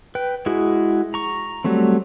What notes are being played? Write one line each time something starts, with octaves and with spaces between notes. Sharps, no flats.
B4 G5
G#3 E4 F#4 G#4
A#5 C#6
F#3 G3 A3 C4